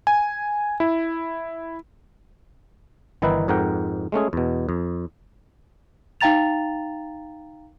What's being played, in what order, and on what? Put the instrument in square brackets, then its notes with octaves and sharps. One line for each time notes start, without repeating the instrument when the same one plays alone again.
[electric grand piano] G#5
E4
[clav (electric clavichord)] G1 D#3 E3 D#4 E4 B4
F2 G#2 A#4 F#5 G5
G#3 A3 C#4 G#4
E2 B2
F2
[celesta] D#4 F5 G5 A#5 A6 F7